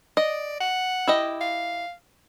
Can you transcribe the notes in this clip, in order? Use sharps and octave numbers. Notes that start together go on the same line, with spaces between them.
D5 D#5
F#5
E4 G4 D#5
F5